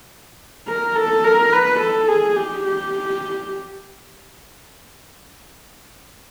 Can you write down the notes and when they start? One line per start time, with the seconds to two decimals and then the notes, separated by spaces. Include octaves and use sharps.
0.68 A#4
0.96 A4
1.24 A#4
1.52 B4
1.80 A4
2.08 G#4
2.36 G4
2.65 G4